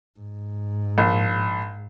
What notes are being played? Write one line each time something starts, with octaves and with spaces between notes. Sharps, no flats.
G#2
A#1